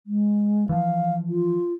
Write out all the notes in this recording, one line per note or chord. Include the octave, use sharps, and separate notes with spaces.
G#3
E3 F3 F5
F4